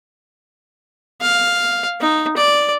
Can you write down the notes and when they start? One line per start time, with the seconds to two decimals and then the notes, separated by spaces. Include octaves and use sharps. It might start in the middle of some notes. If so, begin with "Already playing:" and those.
1.21 F5
2.01 D#4
2.37 D5